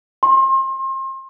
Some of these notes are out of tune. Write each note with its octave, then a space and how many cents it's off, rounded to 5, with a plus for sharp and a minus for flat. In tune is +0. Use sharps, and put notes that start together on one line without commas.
C6 +35